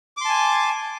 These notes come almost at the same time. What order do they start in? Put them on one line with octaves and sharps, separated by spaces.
D6 C6 A5 G#5